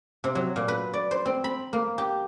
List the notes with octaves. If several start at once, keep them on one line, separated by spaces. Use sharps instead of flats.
C3
F#3
A#2
B4
D5
C5
C4
B5
A#3
G4